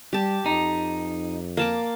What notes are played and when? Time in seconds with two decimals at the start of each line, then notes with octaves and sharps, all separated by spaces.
0.13 G3 G4 A5
0.46 F2 D#4
1.57 A#3 A5 D6